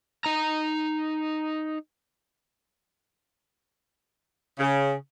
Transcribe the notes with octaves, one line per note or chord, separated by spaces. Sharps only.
D#4 A#5
C#3